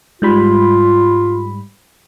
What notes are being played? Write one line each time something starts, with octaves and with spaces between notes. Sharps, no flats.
G#2 G3 F4 B5